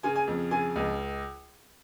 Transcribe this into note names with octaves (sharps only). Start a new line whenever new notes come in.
C#3 G#5
G#5
F2
C#3 G#5
C#2